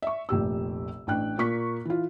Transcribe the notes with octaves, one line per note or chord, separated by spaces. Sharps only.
E5 C#6
F1 A#1 G4 E6
A1 D4 G5 F#6
A#2 A#3 C#6 B6
E3 F4